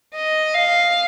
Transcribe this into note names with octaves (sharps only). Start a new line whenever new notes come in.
D#5
F5